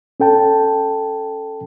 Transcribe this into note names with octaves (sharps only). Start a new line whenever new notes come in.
C#4 A4 G5 A5